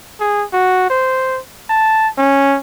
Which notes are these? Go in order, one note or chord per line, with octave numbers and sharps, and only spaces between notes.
G#4
F#4
C5
A5
C#4